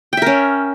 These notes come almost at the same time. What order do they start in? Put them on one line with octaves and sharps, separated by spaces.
G5 E5 A#4 C#4